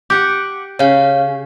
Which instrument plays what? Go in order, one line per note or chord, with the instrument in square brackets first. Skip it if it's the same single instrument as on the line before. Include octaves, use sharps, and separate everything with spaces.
[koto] G4 F#5 [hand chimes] D6
[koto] C#3 [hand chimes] C#5 F5